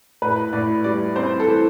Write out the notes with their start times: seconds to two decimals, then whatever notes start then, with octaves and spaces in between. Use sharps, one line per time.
0.22 A2 B4
0.53 A2 D5
0.84 G3 D5
1.16 C4 C5
1.40 A4
1.48 E3